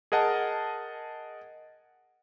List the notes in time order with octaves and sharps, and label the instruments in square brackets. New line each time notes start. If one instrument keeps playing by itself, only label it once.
[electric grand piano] G#4 A#4 D#5 F#5 A5